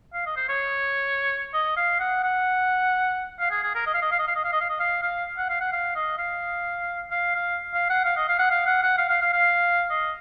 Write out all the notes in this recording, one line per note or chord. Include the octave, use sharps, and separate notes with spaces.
F5
D#5
C5
C#5
D#5
F5
F#5
F#5
F5
G#4
G#4
A#4
D#5
F5
D#5
F5
D#5
F5
D#5
F5
D#5
F5
D#5
F5
F5
F#5
F5
F#5
F5
D#5
F5
F5
F5
F5
F#5
F5
D#5
F5
F#5
F5
F#5
F#5
F5
F5
F5
F5
D#5